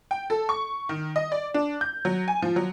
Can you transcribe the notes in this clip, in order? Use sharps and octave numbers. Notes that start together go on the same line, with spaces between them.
G5
A4
C#6
D#3
D#5
D5
D4
G6
F#3
G#5
F3
F#3